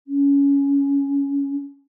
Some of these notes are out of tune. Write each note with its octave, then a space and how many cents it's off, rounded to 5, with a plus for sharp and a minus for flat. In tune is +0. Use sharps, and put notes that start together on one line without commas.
C#4 +15